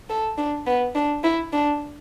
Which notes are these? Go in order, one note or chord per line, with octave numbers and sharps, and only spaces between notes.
A4
D4
B3
D4
E4
D4